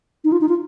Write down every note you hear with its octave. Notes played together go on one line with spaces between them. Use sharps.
D#4
F4
D#4
F4